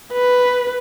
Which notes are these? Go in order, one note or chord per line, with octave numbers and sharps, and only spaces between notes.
B4